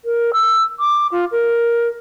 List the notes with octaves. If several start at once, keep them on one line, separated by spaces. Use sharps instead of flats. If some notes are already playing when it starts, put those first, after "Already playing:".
A#4
E6
D6
F4
A#4